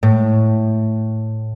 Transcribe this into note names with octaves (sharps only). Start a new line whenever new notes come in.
A2